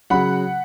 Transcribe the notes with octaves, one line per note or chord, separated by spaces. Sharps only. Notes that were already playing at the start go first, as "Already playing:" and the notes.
C#3 F#3 F#5 B5